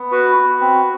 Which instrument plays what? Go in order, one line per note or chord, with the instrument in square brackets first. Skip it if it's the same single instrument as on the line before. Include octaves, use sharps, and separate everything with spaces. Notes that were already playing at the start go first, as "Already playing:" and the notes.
Already playing: [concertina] B3
F#4 B4
F#4
C4